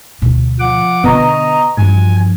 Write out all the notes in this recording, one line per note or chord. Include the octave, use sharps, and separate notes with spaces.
D2 B2
F3 F#5 D6
B2 D3 B3 D#5 A#5 C#6
G2 E3 F3 F4 G#5